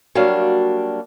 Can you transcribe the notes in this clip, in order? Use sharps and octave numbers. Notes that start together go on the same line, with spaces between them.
F#3 G3 A#3 D4 F#4 F5